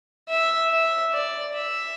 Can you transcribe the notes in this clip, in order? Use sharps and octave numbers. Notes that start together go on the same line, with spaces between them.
E5
E5
D5
E5